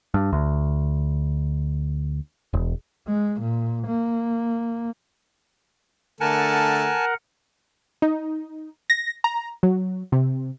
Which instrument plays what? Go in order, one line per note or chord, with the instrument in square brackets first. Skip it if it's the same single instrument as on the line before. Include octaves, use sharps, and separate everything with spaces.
[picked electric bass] G2
D2
E1
[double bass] G#3
A#2
A#3
[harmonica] D3 A3 A4 [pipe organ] A#4 F#5 [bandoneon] G#5 A5
[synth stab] D#4
A#6
A#5
F#3
C3